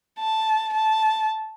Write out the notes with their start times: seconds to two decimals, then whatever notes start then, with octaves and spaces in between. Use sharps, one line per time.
0.19 A5
0.74 A5